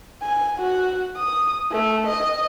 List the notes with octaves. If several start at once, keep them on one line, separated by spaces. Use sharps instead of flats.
G#5
F#4
D#6
A3
D#5